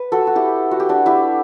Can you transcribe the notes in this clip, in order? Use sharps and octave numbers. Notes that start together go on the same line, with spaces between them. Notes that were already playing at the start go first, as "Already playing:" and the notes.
Already playing: B4
F#4 A4
F#4
E4 G4
F#4
G4
D4 F#4
E4 G4